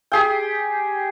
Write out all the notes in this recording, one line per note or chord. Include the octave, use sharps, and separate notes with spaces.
G4 G#4 G5